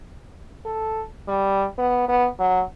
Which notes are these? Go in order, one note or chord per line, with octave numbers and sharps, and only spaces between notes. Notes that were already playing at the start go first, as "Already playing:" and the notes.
A4
G3
B3
B3
F#3